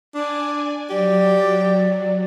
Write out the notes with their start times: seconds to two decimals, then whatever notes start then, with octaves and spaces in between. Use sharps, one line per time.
0.14 D4 D5 G#5
0.90 F#3 G4 D5